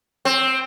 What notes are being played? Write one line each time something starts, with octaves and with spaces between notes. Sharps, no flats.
C4